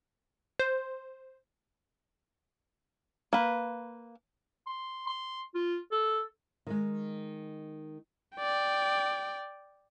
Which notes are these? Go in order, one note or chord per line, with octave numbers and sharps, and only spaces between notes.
C5
A#3 B4
C6
C6
F4
A4
D#3 G#3
D5 G5